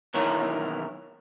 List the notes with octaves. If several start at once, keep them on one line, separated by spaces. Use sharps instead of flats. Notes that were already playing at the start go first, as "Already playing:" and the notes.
B1 D#3 E3 E4 A#4 C#5